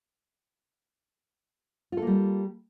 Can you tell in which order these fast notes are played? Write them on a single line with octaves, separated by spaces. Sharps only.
F4 A4 A#3 G3